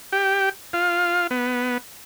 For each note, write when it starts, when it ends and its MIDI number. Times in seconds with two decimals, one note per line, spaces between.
0.12 0.49 67
0.73 1.27 65
1.31 1.78 59